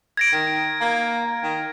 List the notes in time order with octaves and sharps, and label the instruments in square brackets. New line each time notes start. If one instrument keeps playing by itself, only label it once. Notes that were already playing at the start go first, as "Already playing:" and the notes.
[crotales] G#6 A#6 D7
[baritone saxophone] D#3
A#3
D#3